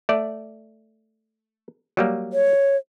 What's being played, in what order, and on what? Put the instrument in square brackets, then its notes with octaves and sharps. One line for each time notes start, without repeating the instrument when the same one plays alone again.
[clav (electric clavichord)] A3 D5
F#3 G3 A#3
[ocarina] C#5